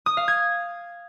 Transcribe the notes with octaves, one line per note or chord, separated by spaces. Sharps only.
D#6
F5
G#6